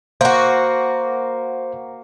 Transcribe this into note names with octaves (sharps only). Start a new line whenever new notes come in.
A#3 F#4 C5